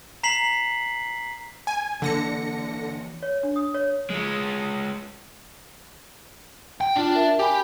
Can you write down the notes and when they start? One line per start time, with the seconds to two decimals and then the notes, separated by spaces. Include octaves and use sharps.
0.23 A#5 B6 C7 F#7
1.67 G#5
2.02 D3 E3 A#3 A#6 C#7
3.23 C#5
3.43 D4
3.56 D#6
3.74 C#5
4.10 G#3 F4
6.81 G5
6.95 D4 F4 G5
7.15 A#4 E5
7.40 G4 G#5 B5